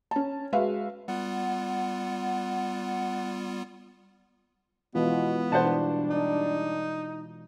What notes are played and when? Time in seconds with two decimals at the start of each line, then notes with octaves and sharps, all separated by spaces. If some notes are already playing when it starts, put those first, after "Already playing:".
0.11 C#4 A5
0.52 G#3 F#4 B4 E5 F5
1.08 G3 B3 F4 F#5
4.95 B2 E3 G#3 B3 F4
5.52 G2 B2 E3 D4 F#4 C5 F#5 A5
6.10 D#4